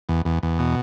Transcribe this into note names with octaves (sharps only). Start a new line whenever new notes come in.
E2
E2
E2
B2